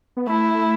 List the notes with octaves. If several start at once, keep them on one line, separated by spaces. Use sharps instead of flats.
B3
A3 E4